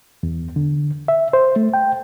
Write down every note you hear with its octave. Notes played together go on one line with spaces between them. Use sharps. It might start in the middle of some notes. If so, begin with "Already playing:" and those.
E2
D3
E5
C5
A3
G5